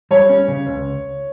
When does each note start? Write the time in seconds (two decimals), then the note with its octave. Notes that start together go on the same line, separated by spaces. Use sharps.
0.11 G3 C#5
0.29 C#4
0.48 C#3
0.66 C#2